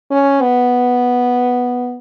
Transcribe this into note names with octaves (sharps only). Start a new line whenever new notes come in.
C#4
B3